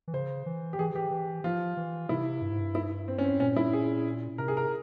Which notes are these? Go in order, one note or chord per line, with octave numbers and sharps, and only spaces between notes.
E3
C#3 C5
E3
G4
E3 G#4
E3 G4
E3
F3 F4
E3
C3 E4
G2
G#2
G2
E4
C4
C#4
C4
A#2 C#4
E4
G#4
C3 A#4
G#4
A#4